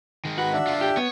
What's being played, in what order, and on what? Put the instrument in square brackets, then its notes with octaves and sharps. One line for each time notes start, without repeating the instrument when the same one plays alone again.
[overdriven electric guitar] D#3 G#3
[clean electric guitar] F#4 [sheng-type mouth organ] B4 B5
[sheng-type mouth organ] D4 E5
[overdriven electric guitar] D3 F4
[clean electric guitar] G4
[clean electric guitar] B3 [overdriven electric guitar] C#5